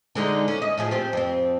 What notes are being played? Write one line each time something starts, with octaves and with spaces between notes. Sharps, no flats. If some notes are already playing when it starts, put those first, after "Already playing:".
D3 G#3 D#4
C#4
D#5
A2 F3 G#4
C4 G4
F2 C4